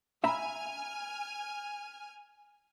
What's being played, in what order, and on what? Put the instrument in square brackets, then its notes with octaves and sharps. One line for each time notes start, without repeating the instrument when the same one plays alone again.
[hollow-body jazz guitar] E5 A#5 B5 [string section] G#5 F6